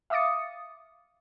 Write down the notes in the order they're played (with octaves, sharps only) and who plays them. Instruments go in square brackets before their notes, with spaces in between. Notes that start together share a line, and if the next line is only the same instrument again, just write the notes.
[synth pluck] E5 F5 D6 D#6 A6 C#7